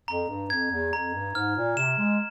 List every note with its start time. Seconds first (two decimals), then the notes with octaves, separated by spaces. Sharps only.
0.08 F2 A#5
0.28 G2
0.50 F2 G#6
0.71 E2
0.93 F2 A#5
1.14 G2
1.35 G#2 F6
1.56 A#2
1.77 C3 E7
1.99 G#3